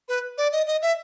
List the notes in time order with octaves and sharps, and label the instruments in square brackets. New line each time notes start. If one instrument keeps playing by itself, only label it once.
[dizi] B4
D5
D#5
D#5
E5